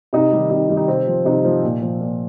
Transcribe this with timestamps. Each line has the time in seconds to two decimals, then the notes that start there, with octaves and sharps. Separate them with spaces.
0.13 C3 D#4
0.32 D#3 G3
0.50 C3 D#4
0.69 D#3 G3
0.77 D#4
0.88 C3 C4
1.06 F3
1.25 C3 D#4
1.45 F3
1.63 A#2
1.82 F3
2.00 A#2